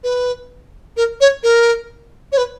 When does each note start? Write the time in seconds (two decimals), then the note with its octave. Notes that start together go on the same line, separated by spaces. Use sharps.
0.03 B4
0.96 A#4
1.20 C#5
1.43 A#4
2.32 C#5
2.37 B4